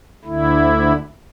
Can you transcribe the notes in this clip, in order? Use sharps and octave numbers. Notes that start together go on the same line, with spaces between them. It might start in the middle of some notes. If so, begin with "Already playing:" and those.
D2 D3 E4